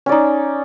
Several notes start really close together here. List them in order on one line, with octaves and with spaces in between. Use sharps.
C#4 D5 D#4